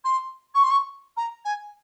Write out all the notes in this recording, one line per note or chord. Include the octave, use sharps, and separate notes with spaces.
C6
C#6
C6
C#6
A#5
G#5